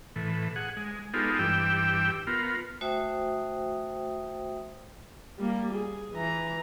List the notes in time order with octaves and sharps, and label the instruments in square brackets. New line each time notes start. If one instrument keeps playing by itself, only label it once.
[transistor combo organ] A2 E3
G#4 F#5
G#3
G#3 B3 D#4 F4 G4 A4
G2 E3 G4 G5 E6
B3 F4 A#4
[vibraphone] A3 F#4 C5 E5 G5 D#6
[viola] G3 A#3
G#4
E3 A#5